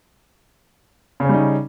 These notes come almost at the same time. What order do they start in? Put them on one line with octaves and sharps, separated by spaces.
C#3 C#4 G3 D#4